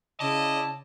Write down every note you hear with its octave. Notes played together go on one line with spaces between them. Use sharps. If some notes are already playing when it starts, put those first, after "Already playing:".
C#3 E4 D5 D#5 A5